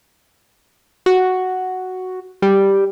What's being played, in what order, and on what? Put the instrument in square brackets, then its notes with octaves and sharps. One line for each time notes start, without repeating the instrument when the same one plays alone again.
[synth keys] F#4
G3